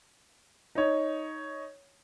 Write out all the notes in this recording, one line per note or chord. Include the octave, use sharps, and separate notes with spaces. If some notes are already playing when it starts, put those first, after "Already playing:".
D#4 C#5